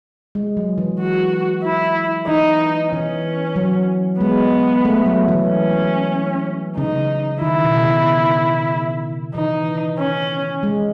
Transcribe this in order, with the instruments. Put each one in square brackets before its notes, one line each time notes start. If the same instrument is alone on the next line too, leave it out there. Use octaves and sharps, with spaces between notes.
[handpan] G#3
F#3
E3
[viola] F#4
E4
[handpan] E3 [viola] D#4
[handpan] E3 [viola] C#4
[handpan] F#3
[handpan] G#3 [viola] B3
[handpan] A3
F#3
E3
[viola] C#4
[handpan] C#3 [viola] D#4
[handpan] D#3 [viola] E4
[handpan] C#3
B2
C#3
[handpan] E3 [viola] D#4
[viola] C#4
[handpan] G#3